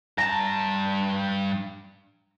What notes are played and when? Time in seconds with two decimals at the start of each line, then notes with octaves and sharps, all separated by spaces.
0.18 G2 A5 A#5